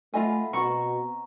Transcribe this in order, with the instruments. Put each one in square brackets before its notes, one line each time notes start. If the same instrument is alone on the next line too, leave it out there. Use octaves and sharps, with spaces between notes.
[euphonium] A3 [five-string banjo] F4 D#5 G#5 [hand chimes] E5 F#5 B5
[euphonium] B2 [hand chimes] C4 A#5 [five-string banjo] F#4 F#5 [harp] C#6